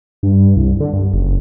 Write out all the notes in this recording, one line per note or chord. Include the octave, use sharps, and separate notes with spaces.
G2
C2
D3
G2
F#1